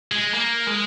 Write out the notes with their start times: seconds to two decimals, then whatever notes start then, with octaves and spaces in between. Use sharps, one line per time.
0.12 G#3
0.34 A#3
0.67 G#3